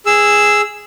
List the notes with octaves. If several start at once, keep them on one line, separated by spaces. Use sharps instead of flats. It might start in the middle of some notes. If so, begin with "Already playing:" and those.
G#4 E6